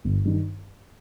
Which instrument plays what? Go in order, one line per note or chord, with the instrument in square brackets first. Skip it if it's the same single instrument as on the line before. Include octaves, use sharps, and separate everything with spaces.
[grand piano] G1
G2 D#3